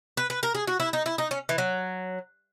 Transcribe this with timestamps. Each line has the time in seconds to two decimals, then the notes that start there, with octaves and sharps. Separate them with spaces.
0.17 B4
0.30 B4
0.43 A#4
0.55 G#4
0.67 F#4
0.80 E4
0.93 D#4
1.06 E4
1.18 D#4
1.31 C#4
1.49 E3
1.58 F#3